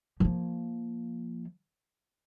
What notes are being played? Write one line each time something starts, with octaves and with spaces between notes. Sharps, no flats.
F3 A#3